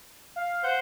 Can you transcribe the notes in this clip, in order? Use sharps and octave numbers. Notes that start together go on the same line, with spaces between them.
F5
C5 F#5 G6